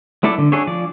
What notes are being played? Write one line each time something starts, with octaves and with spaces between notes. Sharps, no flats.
F#3 A3 E4 A4 D5
D3
D4 F#4 G#4 A4 C#5
F3 D5